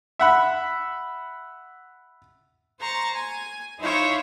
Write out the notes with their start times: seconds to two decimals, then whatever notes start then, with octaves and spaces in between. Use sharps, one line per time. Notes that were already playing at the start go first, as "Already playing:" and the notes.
0.19 E5 F#5 B5
2.80 C5 A#5 C#6 A6
3.16 G#5
3.80 D#4 E4 C5 C#5 E5 F5